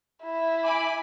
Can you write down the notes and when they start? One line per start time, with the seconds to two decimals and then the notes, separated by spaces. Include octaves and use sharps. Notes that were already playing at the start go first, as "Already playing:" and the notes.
0.23 E4
0.63 G#5 B5 D6